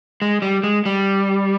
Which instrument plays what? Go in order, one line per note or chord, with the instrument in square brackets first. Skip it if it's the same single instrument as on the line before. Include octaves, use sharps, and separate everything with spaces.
[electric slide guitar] G#3
G3
G#3
G3